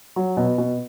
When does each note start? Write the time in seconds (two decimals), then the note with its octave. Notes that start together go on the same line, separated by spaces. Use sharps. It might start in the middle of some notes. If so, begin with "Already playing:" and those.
0.16 F#3
0.37 B2
0.58 B2